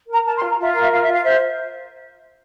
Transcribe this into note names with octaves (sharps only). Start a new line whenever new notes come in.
A#4 A#5
A#4 A5
C6
F4
A#5
F4 E5
A#4 F5
E5
F4 F5
F4 E5
F5
C5 E5